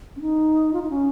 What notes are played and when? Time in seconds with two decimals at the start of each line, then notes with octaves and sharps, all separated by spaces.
0.16 C#4
0.21 D#4
0.73 F4
0.82 D#4
0.90 C#4